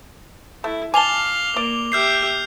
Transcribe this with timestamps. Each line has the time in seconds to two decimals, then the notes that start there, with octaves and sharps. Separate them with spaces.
0.64 A3 E4
0.94 F5 G#5 A5 D6 F7 G7
1.56 A#3 D5
1.92 G4 E5 F6 G6 C7